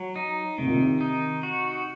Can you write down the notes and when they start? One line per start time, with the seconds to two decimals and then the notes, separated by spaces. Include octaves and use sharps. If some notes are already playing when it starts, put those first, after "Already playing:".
Already playing: F#3
0.16 D#4
0.58 C3 D#3
0.66 A#2
0.73 C3
1.01 D#4
1.43 F#4